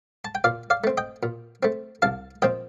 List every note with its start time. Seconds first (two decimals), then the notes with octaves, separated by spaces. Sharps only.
0.25 A5
0.35 G5
0.44 A#2 D5 F5
0.70 D5 F5
0.84 A3 C4
0.97 D#5 G5
1.23 A#2
1.63 A3 C4
2.02 C2 F5 A5
2.42 A#2 F3 C4 D#5 G5